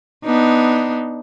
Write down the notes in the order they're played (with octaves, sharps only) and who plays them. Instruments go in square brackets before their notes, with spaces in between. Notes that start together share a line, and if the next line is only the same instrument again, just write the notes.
[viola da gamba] B3 D4 D#4